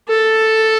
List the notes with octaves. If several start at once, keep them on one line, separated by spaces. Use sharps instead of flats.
A4